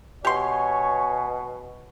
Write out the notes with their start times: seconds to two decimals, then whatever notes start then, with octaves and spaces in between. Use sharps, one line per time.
0.25 B2 G4 C#5 G#5 C6